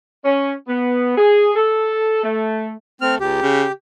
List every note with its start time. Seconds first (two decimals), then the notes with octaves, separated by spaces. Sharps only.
0.25 C#4
0.68 B3
1.18 G#4
1.55 A4
2.23 A3
3.01 A3 C4 F6
3.20 C#2 G4
3.42 C#3